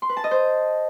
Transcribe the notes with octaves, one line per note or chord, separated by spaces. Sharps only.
C6
B4
A5
D#5
C5